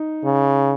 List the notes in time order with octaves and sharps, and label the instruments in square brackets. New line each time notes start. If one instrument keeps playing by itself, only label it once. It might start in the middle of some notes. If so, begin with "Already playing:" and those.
Already playing: [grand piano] D#4
[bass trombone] C#3